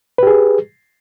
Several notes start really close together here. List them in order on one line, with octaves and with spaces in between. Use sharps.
B4 G4 G#4